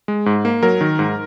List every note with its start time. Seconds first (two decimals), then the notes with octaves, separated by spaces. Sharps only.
0.08 G#3
0.26 G#2
0.45 A#3
0.62 F#3 A#4
0.81 D#3
0.99 G#2